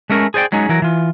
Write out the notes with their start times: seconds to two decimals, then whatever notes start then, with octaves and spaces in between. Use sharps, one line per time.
0.10 G#3 A3 C#4 A#4
0.34 G#4 C5 D5 G5
0.52 F#3 G#3 C#4 D#4 G#4
0.69 E3 F#3 A#4
0.82 E3 F4